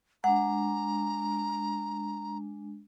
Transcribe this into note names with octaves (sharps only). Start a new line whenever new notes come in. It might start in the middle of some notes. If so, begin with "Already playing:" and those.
G#3 D4 F#5 A#5